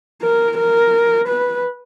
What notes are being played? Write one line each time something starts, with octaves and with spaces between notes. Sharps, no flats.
A#4
A#4
B4